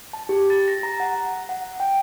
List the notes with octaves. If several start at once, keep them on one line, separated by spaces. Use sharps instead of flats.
A5
G4
A6
A#6
A#5
F#5
F#5
G5